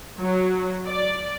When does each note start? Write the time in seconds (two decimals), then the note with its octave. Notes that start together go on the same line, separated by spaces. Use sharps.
0.19 F#3
0.86 D5